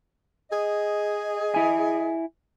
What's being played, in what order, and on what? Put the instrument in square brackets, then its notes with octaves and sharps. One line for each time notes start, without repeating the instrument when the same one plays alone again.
[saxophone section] G#4 D#5
[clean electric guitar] E4 G#5